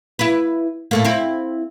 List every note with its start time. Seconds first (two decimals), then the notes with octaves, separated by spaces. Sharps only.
0.19 E4 B4
0.91 A2 A3 A#3
1.05 C4 E4